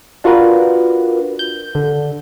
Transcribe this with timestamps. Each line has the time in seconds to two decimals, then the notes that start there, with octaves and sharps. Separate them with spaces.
0.24 D4 F4 F#4 A#4 B4
1.39 G6
1.75 D3